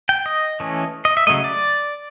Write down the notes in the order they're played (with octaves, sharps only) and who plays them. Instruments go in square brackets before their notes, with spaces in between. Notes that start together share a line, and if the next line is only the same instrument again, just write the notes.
[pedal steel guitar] G5
D#5
E3 A3 C#4
D#5
E5
C#3 F#3 A3 D#5
D5